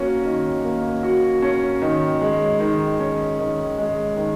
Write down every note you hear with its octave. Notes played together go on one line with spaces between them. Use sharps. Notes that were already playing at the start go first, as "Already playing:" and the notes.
Already playing: A#3 C#4 F#4
D#3
A#3
F#4
C#4
D#3
G#3
D#3
C#4
D#3
G#3
D#3